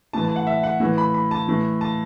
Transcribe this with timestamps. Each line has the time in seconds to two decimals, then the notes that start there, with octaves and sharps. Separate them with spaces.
0.13 A2 E3 A5
0.25 A5
0.36 F#5
0.47 E5
0.63 F#5
0.80 A2 E3
0.98 B5
1.14 B5
1.31 A5
1.47 A2 E3
1.81 A5